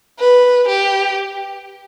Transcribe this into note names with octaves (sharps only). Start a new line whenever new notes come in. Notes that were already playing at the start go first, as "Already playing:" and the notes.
B4
G4